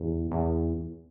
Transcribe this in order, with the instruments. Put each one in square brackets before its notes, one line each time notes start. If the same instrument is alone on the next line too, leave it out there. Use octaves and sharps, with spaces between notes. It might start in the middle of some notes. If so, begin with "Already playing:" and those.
Already playing: [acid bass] E2
E2